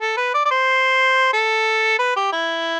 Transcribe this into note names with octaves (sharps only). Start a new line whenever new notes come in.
A4
B4
D5
D5
C5
A4
B4
G4
E4